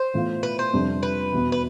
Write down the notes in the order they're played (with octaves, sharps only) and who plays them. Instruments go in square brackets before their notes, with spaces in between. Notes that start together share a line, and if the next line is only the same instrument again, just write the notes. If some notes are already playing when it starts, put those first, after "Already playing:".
Already playing: [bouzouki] C5
[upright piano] A2 E3 B3 F4
[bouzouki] B4
C5
[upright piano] F2 C3 G3 D4
[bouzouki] B4
[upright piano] E2 B2 B3
[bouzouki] B4